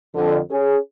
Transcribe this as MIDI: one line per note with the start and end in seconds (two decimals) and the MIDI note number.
0.15 0.38 41
0.15 0.38 50
0.51 0.77 61
0.51 0.77 68